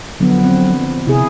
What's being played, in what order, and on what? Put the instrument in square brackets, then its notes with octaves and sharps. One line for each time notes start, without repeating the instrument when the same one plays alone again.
[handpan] D3 F3 B3 [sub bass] F#3
[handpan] C4
[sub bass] C3 [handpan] E4 G#4